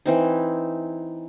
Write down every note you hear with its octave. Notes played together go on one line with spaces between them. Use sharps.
E3 C4 D#4